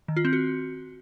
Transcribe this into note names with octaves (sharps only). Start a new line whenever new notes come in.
D#3
F4
C4
F#4